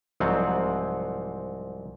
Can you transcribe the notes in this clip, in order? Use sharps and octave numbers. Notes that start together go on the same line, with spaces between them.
C2 G#2 F3 F#3 C4 F#5